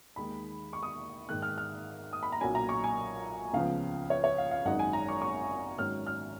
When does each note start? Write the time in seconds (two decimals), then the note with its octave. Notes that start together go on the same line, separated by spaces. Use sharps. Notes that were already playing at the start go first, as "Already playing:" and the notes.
0.16 D#2 D#3 G#3 B5
0.73 C#6
0.83 D#6
1.29 G#2 D#3 G#3 F#6
1.42 F6
1.58 F6
2.13 D#6
2.23 B5
2.32 A#5
2.41 B1 A#2 F#3 C#4 G#5
2.55 A#5
2.69 C#6
2.84 G#5
3.53 C#2 C#3 F3 B3 F5
4.10 C#5
4.24 C#5
4.38 F5
4.51 F5
4.65 G#1 F#2 D#3 G#3 D#4 F#5
4.79 G#5
4.93 A#5
5.08 C#6
5.21 C#6
5.78 G#2 D#3 F#3 C#4 F6
6.07 F6